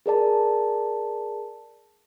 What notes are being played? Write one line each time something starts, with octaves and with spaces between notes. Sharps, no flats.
G#4 A#4 D5 A5